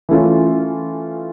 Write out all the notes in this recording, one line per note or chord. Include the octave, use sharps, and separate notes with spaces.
E3 A3 C#4 F4